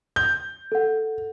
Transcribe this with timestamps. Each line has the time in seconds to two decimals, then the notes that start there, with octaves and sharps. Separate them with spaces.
0.16 G6
0.72 A4 F#5